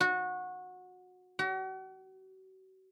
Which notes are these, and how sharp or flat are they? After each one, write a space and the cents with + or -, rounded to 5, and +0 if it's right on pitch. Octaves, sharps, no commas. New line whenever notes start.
F#4 -20
F#4 +40